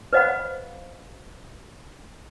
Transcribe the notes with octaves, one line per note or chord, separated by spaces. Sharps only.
B4 C5 D#5 F5 F#5 B5